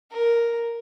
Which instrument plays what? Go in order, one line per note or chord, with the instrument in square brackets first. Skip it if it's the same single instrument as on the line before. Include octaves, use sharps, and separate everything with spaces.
[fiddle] A#4